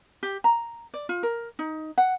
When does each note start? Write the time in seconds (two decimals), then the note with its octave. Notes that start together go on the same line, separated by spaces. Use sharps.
0.23 G4
0.44 A#5
0.94 D5
1.09 F4
1.23 A#4
1.59 D#4
1.98 F#5